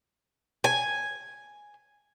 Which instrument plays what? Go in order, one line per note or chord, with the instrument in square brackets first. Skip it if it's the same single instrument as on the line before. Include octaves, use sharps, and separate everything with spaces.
[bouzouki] G#5